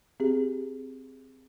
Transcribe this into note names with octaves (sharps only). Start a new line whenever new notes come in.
C4 G4 G#4